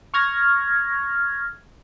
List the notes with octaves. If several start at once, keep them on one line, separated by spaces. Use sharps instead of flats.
C#6 F6 G#6 A#6